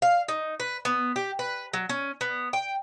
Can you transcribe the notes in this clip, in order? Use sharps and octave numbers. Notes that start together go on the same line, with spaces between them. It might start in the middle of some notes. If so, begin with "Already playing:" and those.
F5
D#4
B4
B3
G4
B4
F#3
C#4
B3
G5